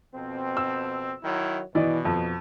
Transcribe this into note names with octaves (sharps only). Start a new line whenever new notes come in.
F2 B2 C4
E6
D#3 F#3 E4
B2 E3 D5 D#5
F2